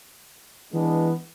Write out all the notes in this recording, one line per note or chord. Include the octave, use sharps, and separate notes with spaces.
E3 G#3 B3 D4